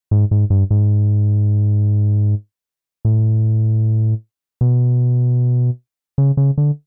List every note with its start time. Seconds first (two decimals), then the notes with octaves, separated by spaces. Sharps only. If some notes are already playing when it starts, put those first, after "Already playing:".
0.11 G#2
0.31 G#2
0.50 G2
0.71 G#2
3.05 A2
4.61 B2
6.18 C#3
6.37 C#3
6.58 D3